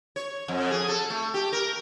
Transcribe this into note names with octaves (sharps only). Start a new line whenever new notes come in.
C#5
F2
G#4
A4
A3
G4
A#4